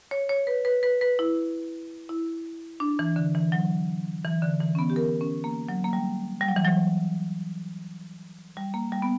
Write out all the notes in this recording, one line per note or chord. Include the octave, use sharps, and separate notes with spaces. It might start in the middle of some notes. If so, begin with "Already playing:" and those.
C#5
C#5
B4
B4
B4
B4
E4
E4
D4
E3
D3
E3
F#3
E3
D3
E3
C#4
B3
G4
A#4
C#4
A#3
F#3
A#3
G3
G3
F#3
E3
F#3
G3
A#3
G3
B3